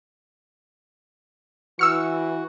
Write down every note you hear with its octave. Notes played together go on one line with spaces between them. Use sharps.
E3 F#4 E6 F6 C#7